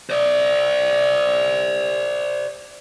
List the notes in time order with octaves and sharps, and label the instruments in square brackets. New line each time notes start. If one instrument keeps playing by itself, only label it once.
[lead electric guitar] C5 D5